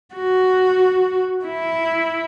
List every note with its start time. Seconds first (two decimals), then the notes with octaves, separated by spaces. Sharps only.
0.14 F#4
1.45 E4